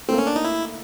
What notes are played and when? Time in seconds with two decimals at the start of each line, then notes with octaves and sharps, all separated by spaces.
0.08 A3 A#3 C4
0.18 C#4
0.27 D4
0.36 D#4
0.45 E4